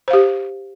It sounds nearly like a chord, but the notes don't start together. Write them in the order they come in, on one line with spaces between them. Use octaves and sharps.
C5 F5 G4